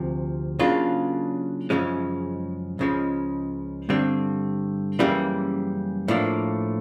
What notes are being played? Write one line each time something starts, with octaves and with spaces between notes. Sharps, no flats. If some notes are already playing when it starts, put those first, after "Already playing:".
Already playing: D2 C3 F3
C#3 F#3 A#3 D4 F4
F#2 C#3 F3 G#3 C#4
C#2 C#3 F3 G#3
G2 D3 G3 C4
F#2 C#3 E3 G3 A#3
A2 F3 A#3 D4